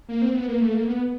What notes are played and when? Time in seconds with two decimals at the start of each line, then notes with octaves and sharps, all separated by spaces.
0.09 A#3
0.22 C4
0.34 B3
0.48 A#3
0.61 A3
0.74 A#3
0.87 B3